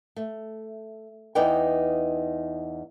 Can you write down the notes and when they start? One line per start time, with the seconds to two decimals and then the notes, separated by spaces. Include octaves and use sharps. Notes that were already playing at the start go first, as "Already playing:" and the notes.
0.16 A3
1.35 E2 D#4 B4 D5 G5